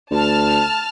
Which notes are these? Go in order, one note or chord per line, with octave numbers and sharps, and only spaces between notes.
D2 A5 F6